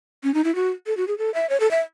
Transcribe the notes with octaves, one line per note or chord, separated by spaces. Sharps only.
C#4
D#4
E4
F#4
A4
F#4
G#4
A4
E5
C#5
A4
E5